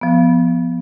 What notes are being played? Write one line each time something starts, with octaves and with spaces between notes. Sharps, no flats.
F3 B3